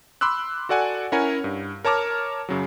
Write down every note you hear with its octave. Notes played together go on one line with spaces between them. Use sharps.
B5 C6 D6 E6 F#6
F#4 A4 D5 F#5 G#5
C#4 E4 A#4 C#5 F#5 G#5
G2
A#4 C#5 A5 A#5 D6 F6
F#2 C#3 F#3